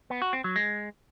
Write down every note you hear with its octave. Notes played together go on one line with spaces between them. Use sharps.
B3
F#4
C4
F#3
G#3